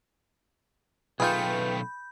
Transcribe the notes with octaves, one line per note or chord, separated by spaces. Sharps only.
B1 A3 F4 G#4 B4 G5 B5 G6